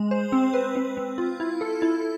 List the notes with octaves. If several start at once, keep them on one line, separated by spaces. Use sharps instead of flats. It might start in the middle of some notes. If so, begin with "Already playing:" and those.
Already playing: G#3
C5
C4
B4
C4
C4
F4
E4
A4
E4